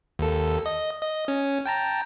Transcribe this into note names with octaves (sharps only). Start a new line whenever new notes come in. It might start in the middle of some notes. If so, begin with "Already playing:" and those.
D#2 A4
D#5
D#5
C#4
G5 A5 A#5